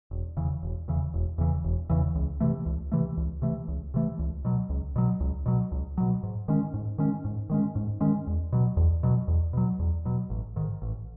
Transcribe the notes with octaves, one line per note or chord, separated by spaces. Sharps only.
E1
E2 C#3 E3
E1
E2 C#3 E3
E1
E2 C#3 E3
E1
E2 C#3 E3
C#2
C3 E3 A3
C#2
C3 E3 A3
C#2
C3 E3 A3
C#2
C3 E3 A3
C#2
B2 F#3
C#2
B2 F#3
C#2
B2 F#3
C#2
B2 F#3
G#2
D#3 G#3 C#4
G#2
D#3 G#3 C#4
G#2
D#3 G#3 C#4
G#2
D#3 G#3 C#4
E2
B2 F#3
E2
B2 F#3
E2
B2 F#3
E2
B2 F#3
A1
G#2 D#3
A1